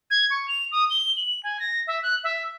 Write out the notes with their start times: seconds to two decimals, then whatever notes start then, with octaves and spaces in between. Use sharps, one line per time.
0.11 G#6
0.30 C#6
0.48 F7
0.72 D#6
0.90 G7
1.17 F#7
1.43 G#5
1.60 A#6
1.87 E5
2.03 F#6
2.24 E5